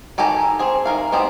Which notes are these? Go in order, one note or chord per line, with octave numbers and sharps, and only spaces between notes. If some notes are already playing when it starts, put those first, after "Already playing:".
D#3 G4 A4 G#5 A#5
C4 G#4
D#3 A#4 F5
B3 C4 G4 D#5